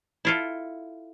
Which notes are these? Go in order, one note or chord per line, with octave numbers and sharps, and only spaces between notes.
E4 F4 A4